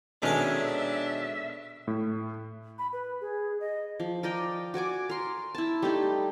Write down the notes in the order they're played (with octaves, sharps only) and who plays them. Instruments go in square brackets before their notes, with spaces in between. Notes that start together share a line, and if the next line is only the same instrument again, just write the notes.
[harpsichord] B2 A4 [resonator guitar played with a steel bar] D#3 G#3 C#4 [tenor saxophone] D4 [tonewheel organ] E5
[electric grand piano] A2
[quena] B5
B4
G#4
D#5
[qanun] F3
A#4 D5 D#5 G5
F#4 D5 G#5 D6
A#4 C6
E4 A5
G3 A3 D#4 G4